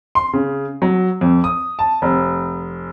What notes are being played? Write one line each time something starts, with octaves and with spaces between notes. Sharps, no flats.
C6
C#3
F#3
F2
D#6
A5
F1